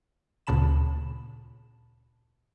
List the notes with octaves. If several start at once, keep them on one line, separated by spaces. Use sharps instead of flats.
D2 A#2 C#3 A5 B5 E7